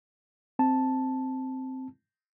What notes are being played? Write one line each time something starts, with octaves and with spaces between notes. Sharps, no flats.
C4 A5